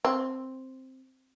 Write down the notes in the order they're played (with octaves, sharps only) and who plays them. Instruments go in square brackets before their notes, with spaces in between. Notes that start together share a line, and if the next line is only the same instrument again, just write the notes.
[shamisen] C4